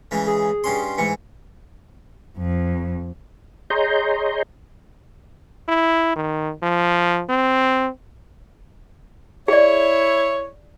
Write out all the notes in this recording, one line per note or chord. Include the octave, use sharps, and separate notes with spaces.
C#3 E3 G#3
G#4
G2 C#4 C6
G#2 E3 C#7
F2
G#4 C#5 D#5 A#5 C6 G6
E4
D#3
F3
C4
E4 G#4 C#5 D5